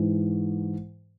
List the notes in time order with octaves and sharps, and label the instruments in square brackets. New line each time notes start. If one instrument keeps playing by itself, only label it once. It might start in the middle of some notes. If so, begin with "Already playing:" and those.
Already playing: [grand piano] G#2 E3